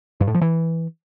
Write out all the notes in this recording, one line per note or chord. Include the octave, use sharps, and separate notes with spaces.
G2
A2
F3
E3